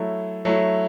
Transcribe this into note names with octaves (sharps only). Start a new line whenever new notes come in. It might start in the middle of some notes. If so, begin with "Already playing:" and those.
Already playing: F#3 A3 E4
F#3 A3 E4